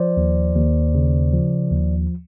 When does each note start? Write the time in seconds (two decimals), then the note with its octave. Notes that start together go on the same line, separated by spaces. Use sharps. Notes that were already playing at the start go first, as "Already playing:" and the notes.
Already playing: F3 C5 D5
0.17 D#2
0.56 D#2
0.94 C#3
1.33 F3
1.71 D#2